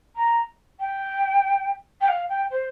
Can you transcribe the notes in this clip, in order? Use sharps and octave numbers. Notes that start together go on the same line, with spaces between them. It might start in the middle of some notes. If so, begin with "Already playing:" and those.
A#5
G5
G5
F5
G5
C5